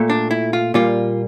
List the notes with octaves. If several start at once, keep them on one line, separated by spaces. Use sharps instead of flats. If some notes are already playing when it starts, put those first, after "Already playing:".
Already playing: A#2 A3
D4
E4
F4
A#2 G3 A#3 F4